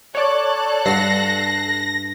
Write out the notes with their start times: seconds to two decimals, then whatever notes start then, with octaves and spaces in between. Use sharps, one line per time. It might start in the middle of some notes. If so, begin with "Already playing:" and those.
0.15 A4 C#5 D5 F#6
0.86 G2 F#5 A#6 C7